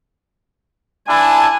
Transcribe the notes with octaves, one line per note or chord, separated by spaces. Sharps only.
D4 E4 G#5 A5